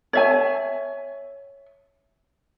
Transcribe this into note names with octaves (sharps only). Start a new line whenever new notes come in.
C#5 E5 G#5